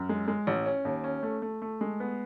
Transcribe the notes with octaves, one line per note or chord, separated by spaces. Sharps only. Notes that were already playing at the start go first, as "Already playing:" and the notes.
Already playing: F#2
G#3
G#3
A1
C#4
D#2
C#4
A3
A3
A3
G#3
B3